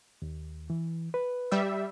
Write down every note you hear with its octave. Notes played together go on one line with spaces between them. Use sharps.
D#2
E3
B4
G3 E5